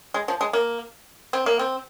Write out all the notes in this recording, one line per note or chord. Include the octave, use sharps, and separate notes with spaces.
G#3
F3
G#3
A#3
C4
A#3
C4